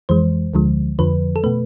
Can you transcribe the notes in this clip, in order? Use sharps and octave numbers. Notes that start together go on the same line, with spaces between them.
F2 E3 G#3 C5
D2 D3 F3 G#3
F2 D3 F3 B4
A4
B2 A3 B4